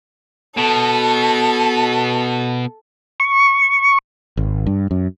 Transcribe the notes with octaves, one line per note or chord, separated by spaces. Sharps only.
B2 A4
C#6
G#1
G2
F#2